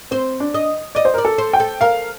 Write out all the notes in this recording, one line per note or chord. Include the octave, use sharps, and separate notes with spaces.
C4 C5
D4
D#5
D5 D#5
C5
A#4 D5
A4
C5
G5
A4
A#4 F5